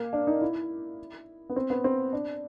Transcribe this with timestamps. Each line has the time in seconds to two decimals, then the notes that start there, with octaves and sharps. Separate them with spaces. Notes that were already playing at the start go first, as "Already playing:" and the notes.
Already playing: A#3
0.13 D4
0.27 D#4
0.42 E4
1.50 B3
1.56 C4
1.70 B3
1.84 C4
2.13 D4